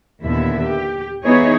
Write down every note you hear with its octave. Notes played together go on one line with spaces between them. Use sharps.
D#2 A#2 D3 B3 E4 E5
G4
E3 B3 D#4 E4 G#4 C#5